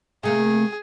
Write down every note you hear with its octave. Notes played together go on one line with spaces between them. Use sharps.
C3 A3 A#3 G#4